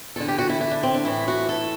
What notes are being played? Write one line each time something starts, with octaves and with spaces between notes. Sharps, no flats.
E2 D3 A4
G4
F#4
E4
E4
D4
C4
D4
A2 E3 E4
F#4
A4